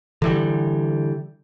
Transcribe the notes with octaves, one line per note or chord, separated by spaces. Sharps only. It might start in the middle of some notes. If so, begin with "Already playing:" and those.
D3 E3 G3